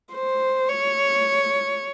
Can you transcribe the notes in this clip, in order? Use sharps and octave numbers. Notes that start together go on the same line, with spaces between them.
C5
C#5